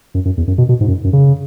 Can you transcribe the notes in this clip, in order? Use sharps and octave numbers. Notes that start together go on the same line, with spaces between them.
F#2
F#2
E2
F#2
B2
B2
G#2
F#2
F#2
C#3